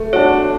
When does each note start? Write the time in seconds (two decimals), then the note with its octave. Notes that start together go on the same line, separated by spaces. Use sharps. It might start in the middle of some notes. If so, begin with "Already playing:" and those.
Already playing: A3
0.13 D4 F#4 C#5